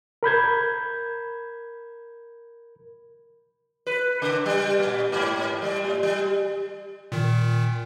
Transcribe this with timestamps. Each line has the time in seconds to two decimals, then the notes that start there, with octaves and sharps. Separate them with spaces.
0.23 A#4 B5 G6 G#6
3.87 B4
4.22 C#3
4.46 G3
4.79 A#2
5.12 G#2
5.62 G3
5.84 A2
6.03 G3
7.12 A#2 D#3